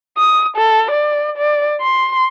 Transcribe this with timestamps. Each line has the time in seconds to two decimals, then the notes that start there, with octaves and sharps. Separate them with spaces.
0.18 D#6
0.57 A4
0.91 D5
1.38 D5
1.81 C6